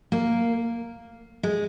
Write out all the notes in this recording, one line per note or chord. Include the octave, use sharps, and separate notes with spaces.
A#3
G#3